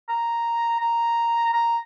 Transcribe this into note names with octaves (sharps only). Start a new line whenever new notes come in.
A#5
A#5
A#5